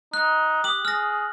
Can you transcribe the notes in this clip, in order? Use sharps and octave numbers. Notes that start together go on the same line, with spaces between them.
D#4 F#6
G4 D#6 F#7
G#4 F6 A#6